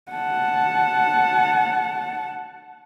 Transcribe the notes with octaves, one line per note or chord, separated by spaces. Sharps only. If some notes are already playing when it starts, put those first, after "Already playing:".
F#5 A5